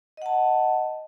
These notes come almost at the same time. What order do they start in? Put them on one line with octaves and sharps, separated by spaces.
D#5 F#5 A5